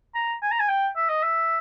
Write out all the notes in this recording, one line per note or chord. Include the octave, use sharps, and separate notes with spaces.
A#5
G#5
A#5
G#5
G5
E5
D#5
E5